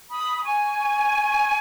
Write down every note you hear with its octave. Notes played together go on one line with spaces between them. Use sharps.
B5 D#6
D#6
G#5 C#6